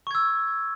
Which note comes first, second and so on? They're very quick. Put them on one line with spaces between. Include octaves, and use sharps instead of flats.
C#6 G#6 E6